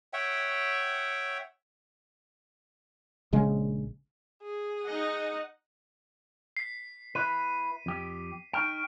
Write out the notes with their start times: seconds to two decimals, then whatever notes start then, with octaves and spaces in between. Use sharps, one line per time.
0.13 C#5 E5 F#5 G5
3.33 A#1 C#3 G#3
4.43 G#4
4.83 D#4 D#5 F#5
6.57 B6 C7
7.15 E4 B4 D#7
7.86 F2 G4
8.53 D#4 G5 C#6 F6 D7